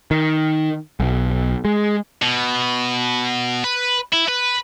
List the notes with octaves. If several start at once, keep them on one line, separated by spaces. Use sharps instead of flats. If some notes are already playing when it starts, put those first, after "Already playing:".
D#3
B1
G#3
B2
B4
E4
B4